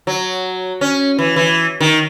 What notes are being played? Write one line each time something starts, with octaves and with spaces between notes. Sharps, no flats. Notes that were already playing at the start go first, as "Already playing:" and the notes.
F#3
C#4
E3
E3
D#3